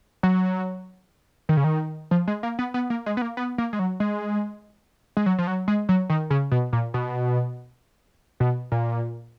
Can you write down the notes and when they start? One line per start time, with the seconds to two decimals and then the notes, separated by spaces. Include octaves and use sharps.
0.23 F#3
1.49 D#3
1.57 C#3
1.64 D#3
2.11 F3
2.28 G#3
2.43 A#3
2.59 B3
2.74 B3
2.90 A#3
3.06 G#3
3.17 B3
3.22 A#3
3.37 B3
3.58 A#3
3.73 G#3
3.79 F#3
4.00 G#3
5.17 G#3
5.26 F#3
5.38 F3
5.47 F#3
5.68 G#3
5.89 F#3
6.10 D#3
6.30 C#3
6.51 B2
6.73 A#2
6.94 B2
8.40 B2
8.72 A#2